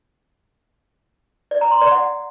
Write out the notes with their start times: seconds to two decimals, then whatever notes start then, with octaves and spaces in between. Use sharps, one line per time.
1.51 D5
1.61 A#5
1.71 C6
1.81 D5
1.92 F#5